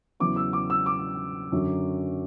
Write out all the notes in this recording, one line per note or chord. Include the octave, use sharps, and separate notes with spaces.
E2 C#3 F#3 B3 E4 D6
E6
D6
E6
D6
F#2 D3 F#3